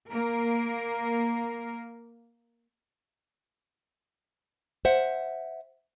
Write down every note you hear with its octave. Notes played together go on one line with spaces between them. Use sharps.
A#3 A#4
C5 E5 F#5